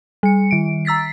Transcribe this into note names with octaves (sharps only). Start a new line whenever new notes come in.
G3 C#7
D#3 D7
A#5 E6 A6 B6 C7